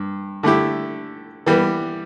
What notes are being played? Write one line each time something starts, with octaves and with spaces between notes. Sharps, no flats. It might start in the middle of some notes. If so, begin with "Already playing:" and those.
Already playing: G2
D3 A3 E4 G4
E3 G3 B3